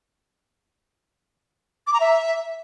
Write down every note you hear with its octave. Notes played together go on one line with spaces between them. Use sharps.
D6
A#5
E5